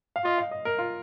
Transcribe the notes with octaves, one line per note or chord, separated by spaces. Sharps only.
F5
F4 D#5
F5
D#5
A#4
F4